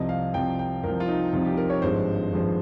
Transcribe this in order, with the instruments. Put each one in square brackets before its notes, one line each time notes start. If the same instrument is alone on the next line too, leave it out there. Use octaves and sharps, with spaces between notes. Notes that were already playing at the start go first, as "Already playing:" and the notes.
Already playing: [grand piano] C2 C3 F3 D#5
F5
C2 C3 F3 G5
G5
C2 C3 F3 A#4
F4
D#4
C2 C3 F3 F4
G4
A#4
C#5
G#1 G2 F3 G#3 C5
G#1 G2 F3 G#3